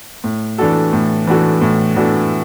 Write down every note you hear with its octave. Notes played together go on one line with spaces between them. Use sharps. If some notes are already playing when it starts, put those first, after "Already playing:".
A2
E3 D4 F#4 A4
A2
E3 D4 F#4 A4
A2
E3 D4 F#4 A4